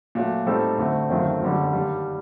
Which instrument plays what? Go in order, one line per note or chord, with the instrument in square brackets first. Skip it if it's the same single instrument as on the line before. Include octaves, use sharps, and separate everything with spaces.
[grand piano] A#2 F#3 A3
A2 G3 C4 D#4 A4
D2 D3 A3 C4
G1 F#2 D#3 A3 C4
F#1 F#2 D3 G3
G2 D#3 G3